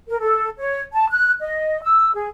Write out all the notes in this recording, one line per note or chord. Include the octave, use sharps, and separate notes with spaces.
A#4
A4
C#5
A5
F#6
D#5
E6
G#4